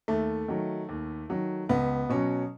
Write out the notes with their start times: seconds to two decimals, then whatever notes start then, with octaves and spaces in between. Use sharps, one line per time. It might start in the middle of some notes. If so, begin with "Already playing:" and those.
0.08 D#2 A3
0.48 D#3 F#3
0.89 D#2
1.30 D#3 F#3
1.69 C#2 B3
2.09 B2 F#3 C#4